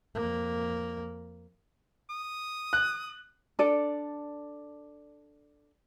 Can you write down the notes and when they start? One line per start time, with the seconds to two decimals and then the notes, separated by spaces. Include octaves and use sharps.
0.15 F2 A#3
2.10 D#6
2.73 F#6
3.59 D4 A4 D5